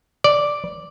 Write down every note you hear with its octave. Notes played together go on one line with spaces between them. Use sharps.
D5